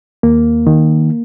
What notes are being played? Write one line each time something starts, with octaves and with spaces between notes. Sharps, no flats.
D#2 A#3
D#3